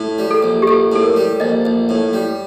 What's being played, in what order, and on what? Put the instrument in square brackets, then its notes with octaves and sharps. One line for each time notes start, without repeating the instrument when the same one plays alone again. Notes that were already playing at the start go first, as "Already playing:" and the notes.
Already playing: [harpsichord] A2
G3
[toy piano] A4
[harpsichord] A#1
[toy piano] G4
[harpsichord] A#1 [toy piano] A4
[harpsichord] A2 [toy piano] A4
[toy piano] A#4
[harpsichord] G3
[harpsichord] A#1 [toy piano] D#5
[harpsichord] A#1
A2
G3